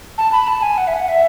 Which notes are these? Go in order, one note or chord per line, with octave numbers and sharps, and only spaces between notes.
A5
B5
A5
G#5
F#5
E5
F#5
E5